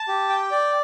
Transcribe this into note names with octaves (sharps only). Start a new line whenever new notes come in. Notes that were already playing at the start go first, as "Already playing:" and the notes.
Already playing: A5
G4
G5
D5